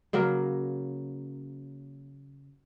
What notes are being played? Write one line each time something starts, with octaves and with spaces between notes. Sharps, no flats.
C#3 F#3 A#3 A#4